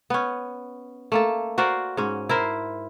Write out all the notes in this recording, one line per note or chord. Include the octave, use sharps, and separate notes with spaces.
B3 C#4
A3 A#3 A4
F#4 A#4 C5 D5
G#2 C#4
E4 A#4 C5